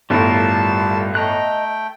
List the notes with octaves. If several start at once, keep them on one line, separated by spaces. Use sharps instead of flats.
G1 A2 G3 F4 A#4 A5 E6
A3 D#5 G5 A#5 F#6